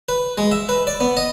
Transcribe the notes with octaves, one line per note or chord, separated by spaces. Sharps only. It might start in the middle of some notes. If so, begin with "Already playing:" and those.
B4
G#3
E5
B4
D5
B3
D#5